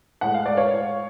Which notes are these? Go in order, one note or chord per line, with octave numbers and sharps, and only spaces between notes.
A2 G#3 F#5
F5
D5
C#5 F5